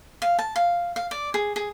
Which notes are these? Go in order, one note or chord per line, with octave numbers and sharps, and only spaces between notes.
F5
A5
F5
F5
D5
G#4
G#4